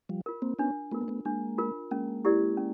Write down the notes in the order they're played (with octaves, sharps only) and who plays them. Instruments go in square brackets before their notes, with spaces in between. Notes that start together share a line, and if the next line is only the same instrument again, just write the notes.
[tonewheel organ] F3 G3
[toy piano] F4 A#4
[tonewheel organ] A#3 C4
[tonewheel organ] B3 C#4 [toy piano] D4
[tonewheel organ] A3 B3 [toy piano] F4 A#4
[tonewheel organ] A#3
A3 B3
[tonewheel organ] G#3 A#3 [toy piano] D4
[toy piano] F4 A#4
[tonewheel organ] G#3 A#3 [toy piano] C#4
[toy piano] E4 G4 A#4 D5
C#4